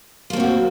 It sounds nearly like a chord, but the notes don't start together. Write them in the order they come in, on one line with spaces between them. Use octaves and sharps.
F4 A#3 C4 F#4